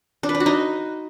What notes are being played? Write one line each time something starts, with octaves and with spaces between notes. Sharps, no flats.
D4
B4
D4
F#4
D#4